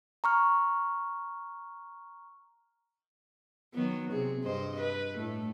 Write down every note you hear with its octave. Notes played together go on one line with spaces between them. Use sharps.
A#5 C#6 F6
D#3 F#3 B3
C3 G#4
G2 C5 D#5
B4
A2 A3